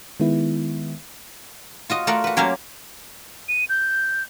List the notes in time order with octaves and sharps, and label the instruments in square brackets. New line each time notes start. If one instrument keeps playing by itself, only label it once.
[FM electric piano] D#3 G#3 B3 E4
[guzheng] F4 F#4 D#5
A3 F4 F#4 A#4 D5 F#5
F#4 B4
F#3 A#3 C#4 G4 C5 F5
[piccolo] D#7
G6